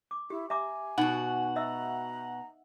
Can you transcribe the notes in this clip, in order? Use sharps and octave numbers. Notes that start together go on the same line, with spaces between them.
D6
E4 G4
E5 G#5 A#5 D6
B2 D#4 F#4 F#5
D#5 E5 A#5 E6